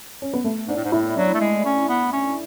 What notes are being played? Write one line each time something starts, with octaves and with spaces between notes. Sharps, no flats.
C#4
B3
A3
G#2 D4
A2
G#2
A2 E4
F#3 D4
A3
G#3
C#4
B3
C#4